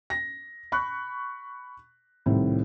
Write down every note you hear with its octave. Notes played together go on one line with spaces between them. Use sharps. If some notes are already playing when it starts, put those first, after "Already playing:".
A#6
B5 C#6 F#6
C2 A2 D#3 C4